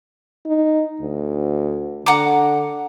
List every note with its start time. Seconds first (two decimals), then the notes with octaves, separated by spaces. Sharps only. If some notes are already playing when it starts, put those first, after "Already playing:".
0.46 D#4
1.00 D2
2.06 D3 F#5 A#5 D6